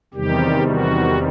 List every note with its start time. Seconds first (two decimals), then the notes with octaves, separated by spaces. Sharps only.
0.14 E2 C3 D#3 G3 G4
0.69 F#4